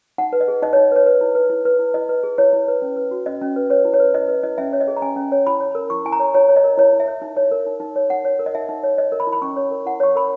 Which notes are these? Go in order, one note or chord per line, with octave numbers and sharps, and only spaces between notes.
D#4 F#5
B4
D#5
G#4
D#4 D#5
D#4 C#5
B4 C#5
B4
E4
B4
E4
B4
E4
E4 D#5
B4
G#4
E4 C#5
E4
B4
C#4
B4
F#4
C#4 D#5
C#4
B4
B4 C#5
E4
C#5
B4
E4 D#5
B4
E4 D#5
C#4 E5
C#5
D#5
G#4
A#5
C#4 G#5
C#4
C#5
E4 B5
C#5
A#4
E4 C#6
E4 G#5
A#5
C#5
E4 C#5
C#5
D#5
A#4
E4 C#5
E4
E5
C#5
D#4
C#5
A#4
D#4
D#4
C#5
D#4 F#5
C#5
A#4
D#5
D#4 E5
D#4
C#5
C#5 D#5
A#4
B5
E4
B5
C#4 C#6
C#5
A#4
E4 F#5
C#5 C#6
A#4 B5